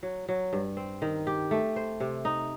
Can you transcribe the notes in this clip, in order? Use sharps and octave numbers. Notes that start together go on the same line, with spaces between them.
F#3
F#3
G2
C4
D#3
G4
A3
C5
C3
D#4